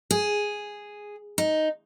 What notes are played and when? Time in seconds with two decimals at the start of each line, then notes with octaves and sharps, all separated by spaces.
0.11 G#4
1.38 D#4